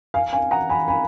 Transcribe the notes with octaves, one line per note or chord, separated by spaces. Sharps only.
F5 G#5
F5 G#5
F#5 A#5
G#5 B5
G#5 B5